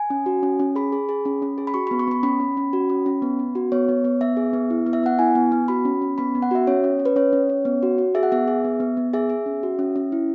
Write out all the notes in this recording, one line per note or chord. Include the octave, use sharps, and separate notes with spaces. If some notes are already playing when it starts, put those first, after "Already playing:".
Already playing: G#5
C#4
F#4
C#4
C#4
G#4 B5
G#4
G#4
C#4
C#4
G#4
B5
F#4 C#6
B3 B5
C#6
B3 B5
C#4 B5
C#4
C#4
F#4
C#4
C#4
B3
B3
F#4
B3 C#5
B3
B3
B3 E5
G#4
B3
E4
B3
E5
B3 F#5
E4 G#5
B3
B3
F#4 B5
C#4
C#4
B3 B5
B3
F#5
F#4 E5
C#4 C#5
C#4
C#4
B4
C#4 C#5
C#4
C#4
B3
F#4
F#4
G#4 E5
F#5
B3 E5
G#4
B3
B3
B3
G#4 E5
G#4
C#4
F#4
C#4
C#4
E4